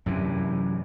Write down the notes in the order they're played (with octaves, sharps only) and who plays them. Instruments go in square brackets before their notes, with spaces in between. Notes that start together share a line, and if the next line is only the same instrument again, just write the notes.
[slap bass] F#2 C3 E3